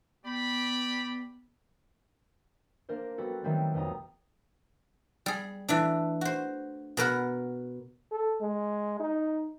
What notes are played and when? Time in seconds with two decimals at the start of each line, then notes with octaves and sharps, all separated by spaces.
0.25 B3 G4 D5 B5
2.89 A#3 D4 A#4 C5
3.18 G3 B3 F#4 A4
3.44 D#3 F#3 G3 A3 B3 C4
3.74 B1 F2 A#5 D#6
5.26 G3 G#4
5.68 E3 A3 D4
6.21 F#4 C5
6.97 B2 A#4 B4 F#5
8.12 A4
8.41 G#3
9.00 D#4